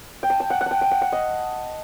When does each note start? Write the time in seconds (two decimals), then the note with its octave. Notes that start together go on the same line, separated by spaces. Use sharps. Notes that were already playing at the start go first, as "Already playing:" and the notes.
0.23 G5
0.30 A5
0.40 G5
0.50 F#5
0.61 F#5
0.66 G5 A5
0.81 G5
0.91 F#5
1.02 F#5
1.12 D#5